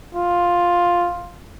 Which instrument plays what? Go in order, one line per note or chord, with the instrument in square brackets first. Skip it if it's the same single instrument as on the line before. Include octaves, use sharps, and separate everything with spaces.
[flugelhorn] F4